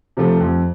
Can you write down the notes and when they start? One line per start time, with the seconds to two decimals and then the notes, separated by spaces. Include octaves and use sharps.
0.17 C3 F3 A3
0.40 F2